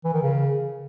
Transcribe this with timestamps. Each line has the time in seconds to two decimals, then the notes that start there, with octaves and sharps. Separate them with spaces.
0.05 E3
0.14 D#3
0.22 C#3